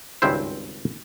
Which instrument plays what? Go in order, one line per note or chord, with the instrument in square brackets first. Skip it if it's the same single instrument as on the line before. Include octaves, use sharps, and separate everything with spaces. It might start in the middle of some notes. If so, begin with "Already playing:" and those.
[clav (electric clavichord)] G#1 C#2 G2 C4 E4 C5